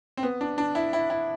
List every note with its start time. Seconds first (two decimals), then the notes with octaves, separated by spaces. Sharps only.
0.17 C4
0.23 B3
0.41 D4
0.58 D4
0.75 E4
0.93 E4
1.10 E4